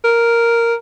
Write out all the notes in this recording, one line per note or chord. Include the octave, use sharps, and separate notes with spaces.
A#4